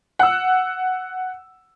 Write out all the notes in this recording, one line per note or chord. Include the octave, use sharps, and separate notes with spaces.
F#5 E6